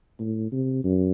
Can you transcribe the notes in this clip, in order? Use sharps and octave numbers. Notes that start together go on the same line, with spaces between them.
A2
C3
F#2